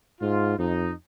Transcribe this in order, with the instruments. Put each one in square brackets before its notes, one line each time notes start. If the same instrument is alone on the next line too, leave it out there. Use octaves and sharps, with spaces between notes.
[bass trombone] G#2 [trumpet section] F4
[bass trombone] F2 [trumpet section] D#4